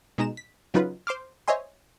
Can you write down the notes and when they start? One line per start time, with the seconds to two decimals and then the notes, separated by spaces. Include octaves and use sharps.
0.18 B2 G#3 D#4 A#5 E7
0.37 B6
0.74 C#3 F#3 D#4 F4 B4
1.07 C5 C6 D6 F6
1.48 C5 C#5 D#5 E5 G#5 C6